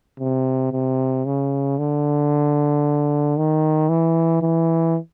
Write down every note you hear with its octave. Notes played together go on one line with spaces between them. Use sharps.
C3
C3
C#3
D3
D#3
E3
E3